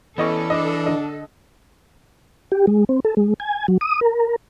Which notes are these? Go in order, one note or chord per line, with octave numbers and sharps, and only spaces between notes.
E3 B3 C#4 A4 D5 D#5 C#6
D4 D#5 D6
D3 D#5
G4
G#3
C4
A4
G#3
G#5
F#3
D#6
A#4